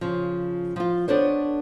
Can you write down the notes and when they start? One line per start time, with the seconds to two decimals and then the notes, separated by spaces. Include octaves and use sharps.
0.01 C#3 F3
0.76 F3 F4
1.08 B3 D4 A4 C5 C#5